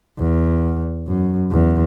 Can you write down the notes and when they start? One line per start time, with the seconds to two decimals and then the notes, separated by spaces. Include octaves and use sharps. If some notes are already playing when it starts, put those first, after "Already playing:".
0.18 E2
1.07 F#2
1.51 E2